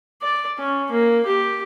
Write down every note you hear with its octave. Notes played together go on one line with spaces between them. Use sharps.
D5
C#4
A#3
G4